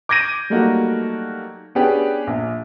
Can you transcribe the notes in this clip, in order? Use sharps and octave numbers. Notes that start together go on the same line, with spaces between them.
D6 G6 G#6 A#6 D7 D#7
F#3 G3 A3 A#3 D#4 F#4
B3 C#4 D4 G4 G#4 B4
A#1